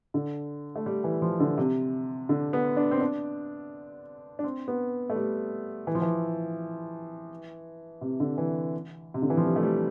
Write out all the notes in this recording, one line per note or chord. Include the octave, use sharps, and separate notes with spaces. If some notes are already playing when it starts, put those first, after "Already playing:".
D3
A3
G3
E3
F3
D3
C3
D3
B3
D4
C4
D4
D4
C4
B3
A3
G3
E3
F3
E3
C3
D3
E3
C3
D3
E3
F3
G3
A3
G3